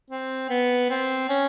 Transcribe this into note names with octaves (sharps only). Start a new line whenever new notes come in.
C4
B3
C4
C#4